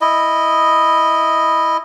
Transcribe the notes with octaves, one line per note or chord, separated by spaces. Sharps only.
E4 D#5